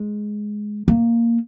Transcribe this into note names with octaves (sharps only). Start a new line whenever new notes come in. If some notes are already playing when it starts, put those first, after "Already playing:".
Already playing: G#3
A#3